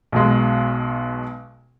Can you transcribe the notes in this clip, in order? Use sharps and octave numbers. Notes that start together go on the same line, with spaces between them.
B1 B2 G#3